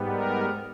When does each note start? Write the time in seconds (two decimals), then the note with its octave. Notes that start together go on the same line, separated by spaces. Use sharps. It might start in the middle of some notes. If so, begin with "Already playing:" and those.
Already playing: G#2 G3 B3
0.09 A#4